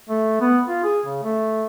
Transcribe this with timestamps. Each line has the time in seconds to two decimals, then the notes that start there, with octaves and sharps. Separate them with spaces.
0.09 A3
0.41 B3
0.67 F4
0.84 G#4
1.06 C#3
1.23 A3